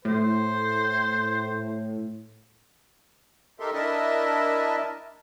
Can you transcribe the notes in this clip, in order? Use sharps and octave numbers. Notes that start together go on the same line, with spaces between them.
A2 C5
D#4 G4 A4 A#4 E5 C6
D4 E4 A#4 D#5 E5 A5